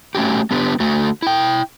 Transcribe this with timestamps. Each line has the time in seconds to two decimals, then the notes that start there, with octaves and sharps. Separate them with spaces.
0.15 A3 C#4 F#4 G4
0.51 B3 D4 G4 B4
0.80 D3 A3 F#4
1.22 E4 G5